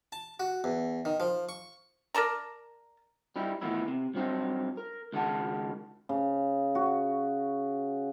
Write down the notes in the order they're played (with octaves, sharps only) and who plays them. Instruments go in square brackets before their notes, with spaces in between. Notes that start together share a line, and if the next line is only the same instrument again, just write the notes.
[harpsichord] A5
F#4
E2
D#3
F3
C#6
[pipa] A#4 D5 A5 A#5
[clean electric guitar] G3 D#4 E4
A2 D#3 E3 B3 D#4 E4
C3
G2 F#3 C4 D#4
A#4
C#2 D#3 G#3 F#5 A5
[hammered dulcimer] C#3
F#4